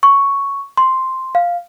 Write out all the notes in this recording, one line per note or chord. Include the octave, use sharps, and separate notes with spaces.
C#6
C6
F5